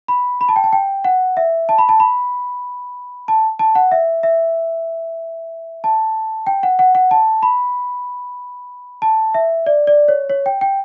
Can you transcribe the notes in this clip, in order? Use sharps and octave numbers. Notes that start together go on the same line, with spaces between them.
B5
B5
A5
G5
A5
G5
F#5
E5
A5
B5
A5
B5
A5
A5
F#5
E5
E5
A5
G5
F#5
F#5
F#5
A5
B5
A5
E5
D5
D5
C#5
C#5
G5
G5